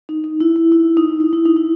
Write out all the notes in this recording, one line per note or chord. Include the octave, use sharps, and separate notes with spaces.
D#4
D#4
E4
E4
E4
D#4
E4
E4
D#4
E4